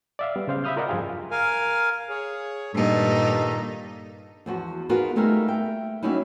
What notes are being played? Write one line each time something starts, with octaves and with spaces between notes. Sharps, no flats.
D5 E5 F5
G3 B3
C#3 C5 F5
E5 F5 B5 D#6 F6 G6
F4 A#4 D5 D#5 F#5
G2 F3 G3 F4 G#4 G5
A#4 F5 G#5
G#4 C#5
G2 A#2 D#3 D#4 A4
E2 F3 F#4
B3 D#4 F4 F#4 G#4 A#4
G3 A3 A#3 D#4 G#4 A#4
E5 G5
F#3 G3 A#3 C#4 D#4 E4